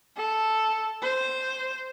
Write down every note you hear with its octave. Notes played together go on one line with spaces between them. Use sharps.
A4
C5